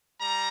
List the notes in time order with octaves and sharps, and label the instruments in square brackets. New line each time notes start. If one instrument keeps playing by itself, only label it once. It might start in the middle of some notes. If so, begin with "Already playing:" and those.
[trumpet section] G3 A#5